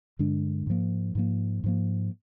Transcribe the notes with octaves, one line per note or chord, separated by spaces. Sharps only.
G2 D3 G#3 D4
G#2 F3 A#3
G#2 F3 A#3
G#2 F3 A#3